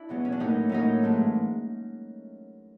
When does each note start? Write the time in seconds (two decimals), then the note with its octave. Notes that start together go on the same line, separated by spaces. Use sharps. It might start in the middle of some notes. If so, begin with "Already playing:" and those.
Already playing: D4 E4
0.09 E2 B2 F#3 B3
0.25 C#4
0.32 D4
0.40 A2 F#3 A#3 C#4 D#4
0.69 A2 F#3 A#3 C#4 D#4
1.03 G#2 E3 A3